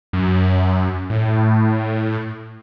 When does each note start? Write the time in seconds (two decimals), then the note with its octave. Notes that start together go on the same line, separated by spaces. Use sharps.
0.13 F#2
1.10 A2